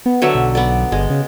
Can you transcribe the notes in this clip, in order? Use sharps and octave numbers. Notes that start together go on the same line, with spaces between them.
B3
D3 F#3 E5
B1
B3 D5
G1 G#3
C#3